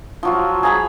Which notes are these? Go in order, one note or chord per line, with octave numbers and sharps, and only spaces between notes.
F3 F#3 F4
G#4 A#5 B5